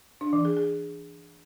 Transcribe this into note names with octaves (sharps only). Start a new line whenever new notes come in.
D4
E3
G#4
G#4